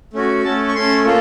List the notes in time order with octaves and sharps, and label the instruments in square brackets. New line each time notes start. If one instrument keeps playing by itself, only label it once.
[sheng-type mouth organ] A3 C#4 F#4
A3 C#4 A4 A5
C#6
A3 C#4 A4 C6
A#3 F4 A4